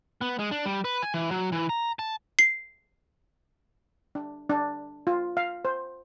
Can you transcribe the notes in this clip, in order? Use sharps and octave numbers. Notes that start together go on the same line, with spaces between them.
B3
G#3
D4
G3
B4
G#5
E3
F#3
E3
A#5
A5
C7
D4
D4
F4
F5
C5